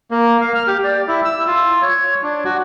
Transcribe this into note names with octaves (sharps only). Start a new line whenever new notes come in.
A#3
F5
F6
G4
D5
E4
E6
F4
C#5
D4
F#4